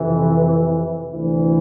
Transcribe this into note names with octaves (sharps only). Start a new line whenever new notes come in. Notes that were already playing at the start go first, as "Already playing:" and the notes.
Already playing: F2 C3 E3
D2 C3 E3